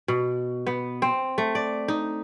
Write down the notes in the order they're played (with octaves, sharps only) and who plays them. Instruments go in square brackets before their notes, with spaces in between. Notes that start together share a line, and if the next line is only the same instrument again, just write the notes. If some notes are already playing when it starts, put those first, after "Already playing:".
[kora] B2
B3
C4
A3
D5
D#4